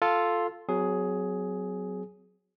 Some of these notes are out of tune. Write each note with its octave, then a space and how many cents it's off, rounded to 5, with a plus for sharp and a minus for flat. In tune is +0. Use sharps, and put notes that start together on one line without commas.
F4 +0 A4 +0
F#3 +0 C4 -45 G#4 +10